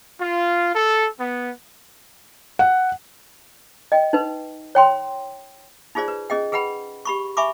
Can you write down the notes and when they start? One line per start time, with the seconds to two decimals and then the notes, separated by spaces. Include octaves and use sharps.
0.19 F4
0.74 A4
1.18 B3
2.59 F#5
3.92 D#5 G5
4.13 D#4 B4
4.75 C#5 G5 C6
5.95 D#4 F4 G#4 C5 D5
6.08 B4
6.30 C#4 G#4 D#5 G5
6.52 G#4 B4 F#5 G5 B5
7.05 G4 B5 C#6
7.37 E5 G#5 B5 C#6 D6